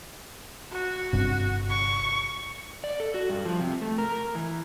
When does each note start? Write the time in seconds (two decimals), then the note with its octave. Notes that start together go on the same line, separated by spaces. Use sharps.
0.71 F#4
1.13 G1 G2 C3
1.69 C#6
2.84 D5
3.00 A4
3.14 F#4
3.30 G2
3.46 F3
3.60 C3
3.81 A3
3.98 A#4
4.35 E3